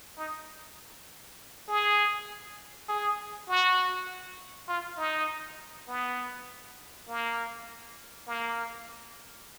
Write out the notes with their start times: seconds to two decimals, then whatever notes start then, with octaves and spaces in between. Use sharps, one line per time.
0.18 D#4
1.68 G#4
2.89 G#4
3.48 F#4
4.69 F4
4.98 D#4
5.88 B3
7.08 A#3
8.28 A#3